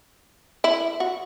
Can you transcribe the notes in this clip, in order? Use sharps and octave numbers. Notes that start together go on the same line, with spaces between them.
E4
F#4